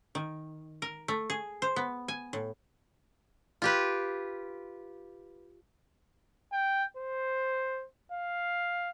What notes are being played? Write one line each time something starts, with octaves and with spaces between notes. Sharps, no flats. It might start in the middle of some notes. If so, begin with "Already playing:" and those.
D#3
A#4
A3
G#4
C5
B3
G#5
A2
F4 G4 B4
G5
C5
F5